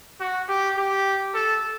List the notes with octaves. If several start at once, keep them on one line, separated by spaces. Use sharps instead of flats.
F#4
G4
G4
A4